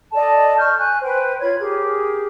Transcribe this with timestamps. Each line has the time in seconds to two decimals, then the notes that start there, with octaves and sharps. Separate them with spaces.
0.12 A4 D5 D#5 A5
0.58 C#6 F6 G6
0.78 G#5 F#6
1.02 B4 C5 G5
1.40 F4 C#5 B5 G#6
1.59 G4 G#4 A#4